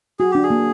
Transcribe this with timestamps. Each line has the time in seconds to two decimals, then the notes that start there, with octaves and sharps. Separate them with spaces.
0.19 F#4 G#4
0.31 D4 G4
0.43 G#4
0.50 A#3